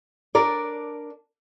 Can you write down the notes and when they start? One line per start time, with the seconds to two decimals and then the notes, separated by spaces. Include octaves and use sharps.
0.35 D4 A#4 D5